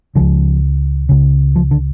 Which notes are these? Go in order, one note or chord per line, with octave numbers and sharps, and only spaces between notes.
C#2 C#3 F3
C#2 C#3
F3
D3